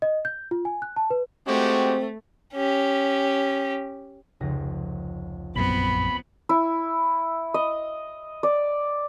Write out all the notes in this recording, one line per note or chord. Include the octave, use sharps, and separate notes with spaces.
D#5
G6
F4
G#5
F#6
A5
B4
G#3 A3 C4 F#4 G4
C#4 G4
F1 C#2 A#6
A#1 F#2 B3 C4 B5
E4
D#5
D5